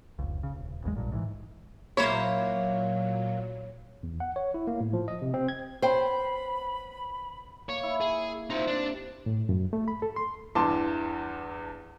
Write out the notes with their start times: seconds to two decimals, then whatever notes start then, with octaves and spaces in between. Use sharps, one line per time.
0.19 F1 C#2
0.43 C#3
0.56 D#1
0.84 G#1 E2 C#3 G#3
0.96 A#1 G2 A#2
1.12 G#2 D#3 E3
1.97 A#2 F#3 A#3 E4 C5 C#5
4.03 E2
4.20 F#5
4.36 C#5
4.54 E4
4.67 A#3
4.81 A2
4.93 F3
5.08 D#5
5.22 C3
5.34 C4
5.48 G#6
5.82 B3 C#4 C5 G5 B5
7.69 A#3 C#5
7.83 E4
8.01 G#4
8.50 C3 D#4 F4 C5
8.67 D4
9.26 A2
9.49 F#2
9.73 A3
9.88 B5
10.02 A4
10.16 C6
10.55 E2 G2 E3 A5 C6 D6